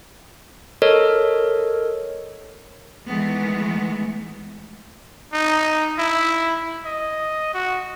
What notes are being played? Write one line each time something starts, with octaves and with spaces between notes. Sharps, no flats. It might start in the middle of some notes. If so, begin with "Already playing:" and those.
A4 A#4 C#5 D#5
D#3 E3 G#3 A3 B3
D#4
E4
D#5
F#4